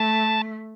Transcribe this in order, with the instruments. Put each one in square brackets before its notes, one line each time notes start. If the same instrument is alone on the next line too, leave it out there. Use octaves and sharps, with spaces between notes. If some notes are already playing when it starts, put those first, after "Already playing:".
Already playing: [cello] A3 [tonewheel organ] A5